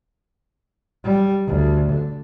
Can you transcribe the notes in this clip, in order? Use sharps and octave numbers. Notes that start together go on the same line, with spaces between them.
G3
D2
D3